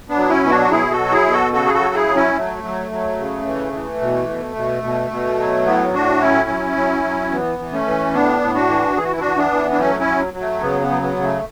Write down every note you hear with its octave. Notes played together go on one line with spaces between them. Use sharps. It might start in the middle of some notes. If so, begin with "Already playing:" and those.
B3 D4
F#3
C#4 E4
B2 E4
D4 F#4
F#4
B2 E4 G#4
F#4 A4
F#3
E4 G#4
B2
F#4 A4
C#3 F#4 A4
G#4
F#4 A4
F#3
E4 G#4
F#3
C#4 E4
F#3 A3
F#3
F#3
C#3
E3
E3
B2
B2
B2
B2
B2
F#3
A2 B3
A2 D4 F#4
F#3 C#4 E4
F#3
F#3
F#3
E3 B3
E3
A3 C#4
E3
A2 B3 D4
A2
D4 F#4
E3
E3 G#4
F#4
E4
E3 D4 F#4
B3 D4
E3
D4
F#3 A3 C#4
C#4 E4
F#3
F#3
A3
C#3 B3
B3
F#3
B3
C#3
A3